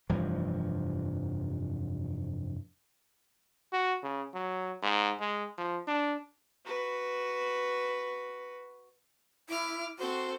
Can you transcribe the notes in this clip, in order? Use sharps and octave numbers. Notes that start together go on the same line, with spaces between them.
F1 G2 E3 F3
F#4
C#3
F#3
G#2
G#3
F3
D4
F#4 B4
E4 D6 F6
C4 F#4 A4 C5